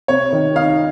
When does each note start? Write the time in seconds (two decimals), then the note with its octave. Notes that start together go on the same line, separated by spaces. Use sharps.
0.08 C3 C#5
0.33 D#3
0.55 D#4 F5